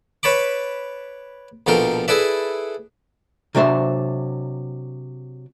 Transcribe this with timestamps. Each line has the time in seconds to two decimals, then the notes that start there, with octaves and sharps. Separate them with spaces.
0.23 B4 C#5 A5 B5 D6
1.67 A#1 B2 F3 A4 A#4 G5
2.08 E4 G#4 A4 B4 D5 E5
3.55 C3 F#3 D4 C5 E5